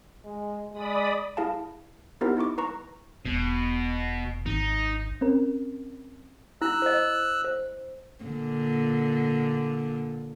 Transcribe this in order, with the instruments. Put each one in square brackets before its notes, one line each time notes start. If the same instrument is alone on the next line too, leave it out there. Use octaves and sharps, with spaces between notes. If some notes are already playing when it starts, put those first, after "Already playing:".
[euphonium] G#3
[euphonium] G#3 [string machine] D5 B5 D#6
[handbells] E4 G#4 F5 A5
B3 D#4 E4 G4 A#4 C5
D#4 E4 C#6 D6
B4 A#5 C#6
[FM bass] E1 [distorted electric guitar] B2
[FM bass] G#1 [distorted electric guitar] D#4
[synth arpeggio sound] C4 C#4 A#4
[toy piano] E4 [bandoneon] E6 F#6
[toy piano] C5 D#5
C5
[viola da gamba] A#2 D3